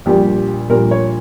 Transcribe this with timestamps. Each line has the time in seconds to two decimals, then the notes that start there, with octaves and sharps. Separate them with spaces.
0.06 A#1 A#2 G3 G4
0.69 A#1 A#2 G3 A#4
0.91 C#5